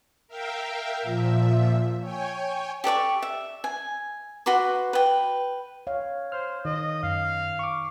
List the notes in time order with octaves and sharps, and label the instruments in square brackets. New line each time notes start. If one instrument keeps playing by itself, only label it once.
[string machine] A#4 E5 F5 G5
A#2 F3 E5
C#5 G5 G#5
[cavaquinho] G4 A4 D5 C#6
E5
G#5
F#4 B4 C6 D6
B4 G5
[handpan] C#5 F5
[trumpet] C5 [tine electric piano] F6
[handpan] D#3 [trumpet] D#5
[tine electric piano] F#2 [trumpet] F5
[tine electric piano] C#6 D6